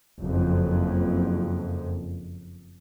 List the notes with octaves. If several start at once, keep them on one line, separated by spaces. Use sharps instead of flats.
F#1 F2